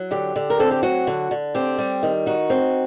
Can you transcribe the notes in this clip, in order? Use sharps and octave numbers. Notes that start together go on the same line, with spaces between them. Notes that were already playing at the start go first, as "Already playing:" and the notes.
Already playing: F#3
D3 G4
D3
A#4
C4 A4
G4
F#3 F#4
D3
D3
C4 G4
G3
D#3
D#4 F#4
C4